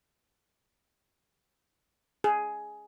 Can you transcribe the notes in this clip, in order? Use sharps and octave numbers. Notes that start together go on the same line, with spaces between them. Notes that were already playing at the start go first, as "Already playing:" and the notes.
G#4